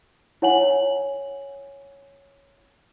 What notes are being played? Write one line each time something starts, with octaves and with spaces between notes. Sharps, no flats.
E4 C#5 F#5 G#5 F#7